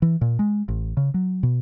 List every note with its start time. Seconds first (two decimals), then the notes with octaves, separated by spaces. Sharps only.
0.02 E3
0.21 A#2
0.39 G#3
0.68 A1
0.97 C#3
1.14 F#3
1.43 B2